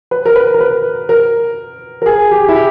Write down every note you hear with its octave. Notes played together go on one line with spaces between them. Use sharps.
B4
A#4
B4
A#4
B4
A#4
A#4
G#4
G4
E4
G4